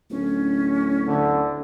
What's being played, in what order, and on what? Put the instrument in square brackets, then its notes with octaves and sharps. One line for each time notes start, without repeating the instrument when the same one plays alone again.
[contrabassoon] D1 [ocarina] C#4
[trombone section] D2 D3